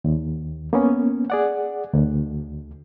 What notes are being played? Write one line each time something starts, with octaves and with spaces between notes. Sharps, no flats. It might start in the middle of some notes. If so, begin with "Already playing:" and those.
D#2
A#3 B3 C#4
G#4 D5 F#5
D2